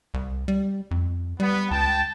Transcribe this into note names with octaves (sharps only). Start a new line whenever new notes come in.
C2
G3
F2
G3 B3
C#2 G5 A5